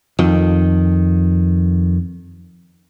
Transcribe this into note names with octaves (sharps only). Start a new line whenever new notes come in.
F2 D#3